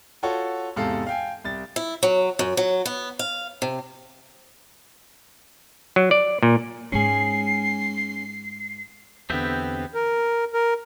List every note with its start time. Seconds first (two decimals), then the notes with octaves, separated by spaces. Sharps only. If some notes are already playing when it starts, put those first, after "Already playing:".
0.23 F4 F#4 A4 C#5
0.76 E2 G#2 C3 A4 F5
1.07 F5 G5 G#5
1.44 C2 A6
1.76 E4
2.03 F#3
2.39 F#2
2.57 F#3
2.86 B3
3.19 F5
3.62 C3
5.96 F#3
6.11 D5
6.43 A#2
6.92 G#2 G#3 C#4 G#4 C7
9.30 E2 D3 B3 C4 G4 E5
9.94 A#4
10.54 A#4